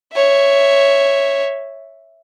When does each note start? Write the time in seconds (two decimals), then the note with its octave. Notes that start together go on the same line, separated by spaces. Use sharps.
0.14 C#5 E5